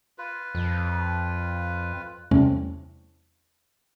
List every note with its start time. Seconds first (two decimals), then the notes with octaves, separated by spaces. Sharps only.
0.18 F4 B4
0.55 F2
2.31 E2 C3 G3 A3 C#4